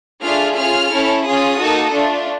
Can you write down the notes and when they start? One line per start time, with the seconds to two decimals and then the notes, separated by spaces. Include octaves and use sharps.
0.22 A3 D4 F4 G#4 F6
0.56 C#4 F4 G#4 F6
0.90 C#4 E4 A4
1.24 C#4 F4 G#4 D#6
1.59 A#3 D#4 F#4 A4
1.92 A3 D4 F4